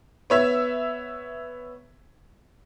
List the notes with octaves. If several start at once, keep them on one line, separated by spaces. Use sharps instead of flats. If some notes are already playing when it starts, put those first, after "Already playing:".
B3 C#5 E5